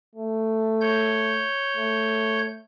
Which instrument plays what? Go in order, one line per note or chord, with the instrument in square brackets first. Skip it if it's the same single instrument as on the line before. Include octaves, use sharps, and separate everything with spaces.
[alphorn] A3
[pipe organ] C#5 G6
[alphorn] A3